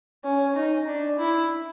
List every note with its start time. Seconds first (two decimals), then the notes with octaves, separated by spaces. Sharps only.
0.24 C#4
0.56 D#4
0.87 D4
1.19 E4